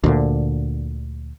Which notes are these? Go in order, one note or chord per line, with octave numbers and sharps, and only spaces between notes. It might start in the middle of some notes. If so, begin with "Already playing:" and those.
D2 A#2 D3